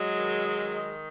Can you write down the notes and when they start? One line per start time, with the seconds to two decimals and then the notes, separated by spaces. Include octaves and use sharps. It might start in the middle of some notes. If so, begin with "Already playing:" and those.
Already playing: F#3 G#3
0.16 D#3
0.57 D#3